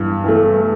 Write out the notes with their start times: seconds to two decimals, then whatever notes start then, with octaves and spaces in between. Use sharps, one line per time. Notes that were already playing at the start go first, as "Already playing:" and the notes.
Already playing: G2 E3
0.24 E3 A3